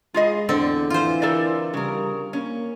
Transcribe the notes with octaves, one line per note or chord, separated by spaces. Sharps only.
G#3 F4 G#4 D#5
E2 D3 C4 D5
E3 F4 C5
A4 A#4 D5
C#3 G3 A#4
A#3 C#4